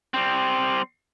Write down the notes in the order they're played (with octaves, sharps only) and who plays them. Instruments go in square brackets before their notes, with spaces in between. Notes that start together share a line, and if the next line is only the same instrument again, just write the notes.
[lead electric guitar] G3 C4